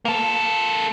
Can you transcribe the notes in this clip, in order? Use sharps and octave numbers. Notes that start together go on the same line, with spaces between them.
A#3 A4